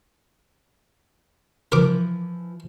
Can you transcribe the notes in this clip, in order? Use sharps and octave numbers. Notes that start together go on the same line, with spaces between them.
E3 F3 A#4 D6